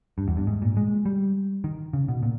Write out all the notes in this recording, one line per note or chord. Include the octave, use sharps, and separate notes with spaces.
G2
E2
G2
G#2
A#2
G#3
G3
D#3
C#3
B2
A#2